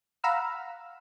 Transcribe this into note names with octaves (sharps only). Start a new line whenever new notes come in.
F5 F#5 A#5 B5 E6 F6